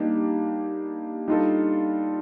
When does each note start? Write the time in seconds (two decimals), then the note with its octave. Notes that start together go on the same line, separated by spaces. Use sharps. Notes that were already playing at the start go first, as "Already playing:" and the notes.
Already playing: G3 A#3 D4 D#4 G4
1.28 G3 D4 D#4 F4 A4